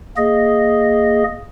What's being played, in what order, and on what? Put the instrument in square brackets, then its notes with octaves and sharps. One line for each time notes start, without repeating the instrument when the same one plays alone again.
[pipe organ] A#3 G#4 D#5